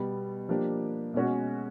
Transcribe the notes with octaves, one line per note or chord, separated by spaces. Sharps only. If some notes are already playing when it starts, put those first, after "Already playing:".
Already playing: B2 G3 B3
F3 A#3 D4 G4
B2 G#3 C#4 F#4